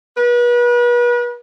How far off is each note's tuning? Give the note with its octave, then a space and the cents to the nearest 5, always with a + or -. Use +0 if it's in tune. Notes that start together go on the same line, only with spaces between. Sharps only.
B4 -35